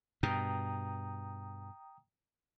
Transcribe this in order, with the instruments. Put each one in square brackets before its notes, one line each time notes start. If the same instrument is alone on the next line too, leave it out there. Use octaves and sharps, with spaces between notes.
[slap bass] G2 B2 [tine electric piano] G5 A#5 D#6